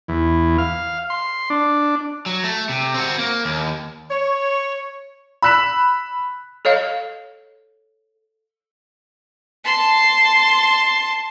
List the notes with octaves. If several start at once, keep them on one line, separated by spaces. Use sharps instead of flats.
E2
F5
C6
D4
F#3
A3
C3
C4 F#4
A#3
D#2
C#5
B5 E6 F#6 B6 E7
A4 C#5 D#5 F5
A5 C6